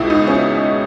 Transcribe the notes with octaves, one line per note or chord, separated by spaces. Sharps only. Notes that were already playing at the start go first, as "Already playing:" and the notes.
Already playing: C#2 B2 E4
D#4
C#4